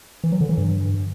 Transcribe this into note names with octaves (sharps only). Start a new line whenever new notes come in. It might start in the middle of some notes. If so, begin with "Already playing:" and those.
E3
F#3
D3
E3
G2